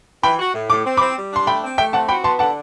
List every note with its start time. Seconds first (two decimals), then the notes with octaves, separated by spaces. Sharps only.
0.23 E3 G5 B5
0.39 F#4
0.54 A2
0.70 A2 D6
0.85 C4
0.97 B5 D6
1.01 C4
1.17 G3
1.31 D4 C6
1.47 A3 G5 B5
1.63 C4
1.78 A3 E5 G5
1.93 C4 F#5 A5
2.08 F#4 G5 B5
2.24 B3 A5 C6
2.39 D3 F#5 A5